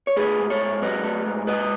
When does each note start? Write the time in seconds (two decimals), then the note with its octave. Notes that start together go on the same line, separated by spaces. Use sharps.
0.07 C#5
0.17 A3 G#4 B4
0.39 G#2
0.50 A4 C#5
0.61 G#2
0.82 F#3 B4 D#5
1.04 A3
1.26 G#2
1.47 G#3 B4 D#5